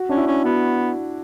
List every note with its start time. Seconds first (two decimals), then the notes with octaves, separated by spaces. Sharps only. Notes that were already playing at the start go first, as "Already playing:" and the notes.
Already playing: F#4
0.09 C#4 D4
0.17 E4
0.27 C#4
0.44 B3 F#4